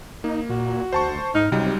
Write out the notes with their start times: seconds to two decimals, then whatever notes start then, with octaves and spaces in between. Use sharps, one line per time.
0.24 A#3 D#4
0.50 A#2 F#4
0.93 D2 C5 A5 C#6
1.35 G#2 D#4 F6
1.52 C#2 C3 F#3 G3 D#4